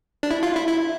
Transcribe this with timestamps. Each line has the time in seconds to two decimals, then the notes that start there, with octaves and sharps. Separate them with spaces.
0.23 D4
0.31 E4
0.43 F4
0.56 E4
0.67 E4